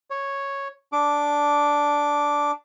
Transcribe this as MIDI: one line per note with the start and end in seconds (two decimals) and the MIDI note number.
0.10 0.68 73
0.92 2.51 62
0.92 2.51 86